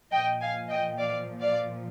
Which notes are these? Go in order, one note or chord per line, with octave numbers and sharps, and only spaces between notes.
A#2 F3 D#5 G5
F5 G#5
D#5 G5
D5 F5
D5 F5